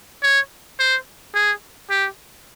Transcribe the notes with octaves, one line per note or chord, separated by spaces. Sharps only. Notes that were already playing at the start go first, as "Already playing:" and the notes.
C#5
C5
G#4
G4